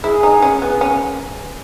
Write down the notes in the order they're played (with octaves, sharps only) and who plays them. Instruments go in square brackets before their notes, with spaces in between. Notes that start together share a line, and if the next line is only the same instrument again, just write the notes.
[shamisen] E4 [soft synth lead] G#4
[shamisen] D#4
C#4
B3
C#4